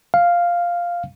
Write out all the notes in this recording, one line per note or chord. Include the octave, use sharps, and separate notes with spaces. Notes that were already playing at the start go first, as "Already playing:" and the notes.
F5